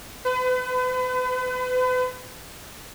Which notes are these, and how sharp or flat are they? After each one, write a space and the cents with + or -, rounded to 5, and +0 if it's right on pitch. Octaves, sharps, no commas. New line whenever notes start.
B4 +40